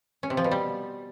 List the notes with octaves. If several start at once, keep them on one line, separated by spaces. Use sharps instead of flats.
C#4
C3
F3
B2
G3